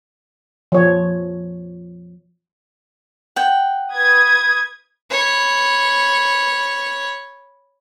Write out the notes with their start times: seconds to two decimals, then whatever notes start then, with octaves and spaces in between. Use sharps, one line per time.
0.72 F3 C#5
3.36 F#5 G5
3.92 B4 D#6 G#6
5.10 C#5 B5